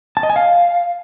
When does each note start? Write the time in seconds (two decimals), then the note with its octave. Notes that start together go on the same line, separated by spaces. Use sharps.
0.17 A5
0.23 D#5
0.30 G#5
0.36 F5